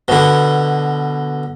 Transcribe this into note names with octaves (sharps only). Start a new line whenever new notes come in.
B2 D3